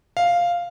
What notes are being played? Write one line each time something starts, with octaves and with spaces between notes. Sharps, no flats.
F5